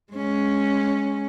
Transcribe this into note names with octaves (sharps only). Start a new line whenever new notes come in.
G#3 C#4